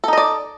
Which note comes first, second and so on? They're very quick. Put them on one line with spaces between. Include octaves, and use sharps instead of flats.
A4 D#4 D#5 D5